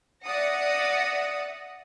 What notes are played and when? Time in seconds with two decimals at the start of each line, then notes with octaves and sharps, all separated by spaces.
0.24 D5 E5 F#5 D#6 A#6 C#7